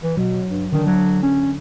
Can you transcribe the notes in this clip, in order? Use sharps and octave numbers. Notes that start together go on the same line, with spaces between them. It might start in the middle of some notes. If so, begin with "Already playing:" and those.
E3
B2 F#3
G2
D3 D#3 D4
F#3
C#4